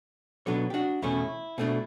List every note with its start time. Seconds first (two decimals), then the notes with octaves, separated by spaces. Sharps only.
0.46 B2 F#3 B3 D4 A4 C#5
0.70 G4
0.74 D4 F#4
1.02 E2 B2 A3 C#4 E4
1.58 B2 A3 D4